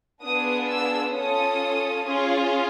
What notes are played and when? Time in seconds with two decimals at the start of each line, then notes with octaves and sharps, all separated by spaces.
0.23 B3 D4 F4 G#4 D#6
0.69 E6
1.14 C#4 F4 A4 D#6
2.03 C#4 F4 G#4